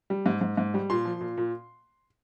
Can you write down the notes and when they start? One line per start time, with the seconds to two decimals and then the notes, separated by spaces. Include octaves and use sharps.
0.10 G3
0.26 G#2
0.41 G#2
0.57 G#2
0.74 G3
0.90 A#2 C6
1.05 F3
1.21 A#2
1.37 A#2